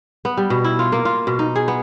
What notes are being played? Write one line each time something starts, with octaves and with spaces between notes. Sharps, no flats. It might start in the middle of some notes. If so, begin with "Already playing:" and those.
B3
G3
B2
E4
F4
A#3
F4
B2
D#4
G#4
B3